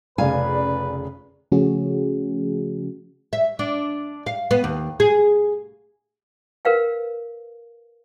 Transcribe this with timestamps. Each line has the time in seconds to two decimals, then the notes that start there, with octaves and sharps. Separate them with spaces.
0.18 F1 C#3 B4 D5 F5 G#5
1.52 C#3 F3 A3 C#4 F#4 G#4
3.33 E5
3.59 D4
4.26 F5
4.51 B3
4.64 D#2
5.00 G#4
6.65 A#4 B4 F5 G5